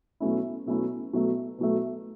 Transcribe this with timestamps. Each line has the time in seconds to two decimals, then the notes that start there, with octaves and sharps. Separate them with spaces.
0.20 B2 F#3 A3 C#4 E4
0.66 B2 F#3 A3 C#4 E4
1.13 B2 F#3 A3
1.58 B2 F#3 A3